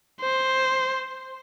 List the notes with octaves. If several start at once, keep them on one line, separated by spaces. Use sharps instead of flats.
C5